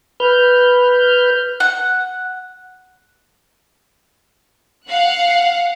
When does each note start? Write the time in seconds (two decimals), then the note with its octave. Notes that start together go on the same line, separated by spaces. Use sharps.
0.20 B4 F6 G6
1.60 F#5
4.88 F5 F#5 F#6